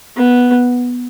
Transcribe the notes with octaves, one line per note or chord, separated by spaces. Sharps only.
B3